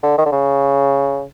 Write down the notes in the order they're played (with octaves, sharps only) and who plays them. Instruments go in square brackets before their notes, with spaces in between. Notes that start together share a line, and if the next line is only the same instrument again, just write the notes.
[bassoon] D3
D#3
D3
C#3